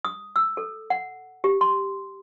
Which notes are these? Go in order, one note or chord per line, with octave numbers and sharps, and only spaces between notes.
D#6
E6
A4
F#5
G4
C6